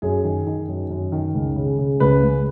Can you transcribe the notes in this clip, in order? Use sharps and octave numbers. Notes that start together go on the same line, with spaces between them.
F#2 G#4
D#3
D#3
F#2
F#2
D#3
C#2
C#3
C#3
C#2 B4
C#2